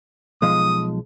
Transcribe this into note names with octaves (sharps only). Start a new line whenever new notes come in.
B1 F3 G#3 D#6